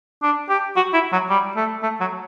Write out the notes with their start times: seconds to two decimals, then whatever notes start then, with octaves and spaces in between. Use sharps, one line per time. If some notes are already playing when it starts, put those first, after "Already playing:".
0.23 D4
0.49 G4
0.76 F#4
0.94 E4
1.12 F#3
1.30 G3
1.56 A3
1.83 A3
2.00 F#3